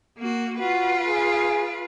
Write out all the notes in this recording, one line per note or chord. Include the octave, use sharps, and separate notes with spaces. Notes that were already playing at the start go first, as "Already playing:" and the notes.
A#3 F#4
F4 F#4 B4
G#4